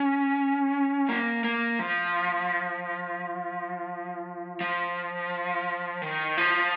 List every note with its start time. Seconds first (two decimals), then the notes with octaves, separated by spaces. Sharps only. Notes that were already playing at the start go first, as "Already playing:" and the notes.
Already playing: C#4
1.09 A#3
1.44 A#3
1.79 F3
4.61 F3
6.02 D#3
6.38 F3